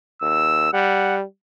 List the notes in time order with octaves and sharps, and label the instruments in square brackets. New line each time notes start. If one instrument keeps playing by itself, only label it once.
[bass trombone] D#2 [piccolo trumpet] E6
[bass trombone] G3 [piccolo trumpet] F#5